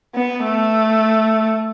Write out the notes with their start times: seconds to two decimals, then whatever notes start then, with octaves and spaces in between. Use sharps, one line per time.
0.15 B3
0.44 A3